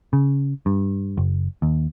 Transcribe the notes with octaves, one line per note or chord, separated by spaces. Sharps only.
C#3
G2
F#1
D#2